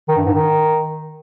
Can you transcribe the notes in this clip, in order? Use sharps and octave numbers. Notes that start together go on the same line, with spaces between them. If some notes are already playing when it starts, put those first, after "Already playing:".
D#3
G2
G#2
D#3